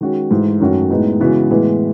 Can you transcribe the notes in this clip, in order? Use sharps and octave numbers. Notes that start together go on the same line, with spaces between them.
D#3 G#3 C#4 F#4
G#2 E3 A3
F#2 D#3 A3 C#4 F#4
A2 G#3 B3 D#4
C#3 E3 G#3 B3 F#4
A2 E3 G#3 B3